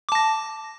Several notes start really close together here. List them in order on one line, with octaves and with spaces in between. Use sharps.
D6 A5 A#6